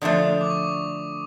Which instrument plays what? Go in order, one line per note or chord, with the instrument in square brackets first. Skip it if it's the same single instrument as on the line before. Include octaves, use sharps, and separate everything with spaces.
[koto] D3 F3 A3 D4 [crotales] D#6
[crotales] D6
C#6